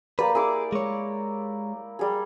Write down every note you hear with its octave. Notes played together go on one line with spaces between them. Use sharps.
A#3 G4 B4 D5
E4 G#4 D6
G#3 C#5
G3 G#4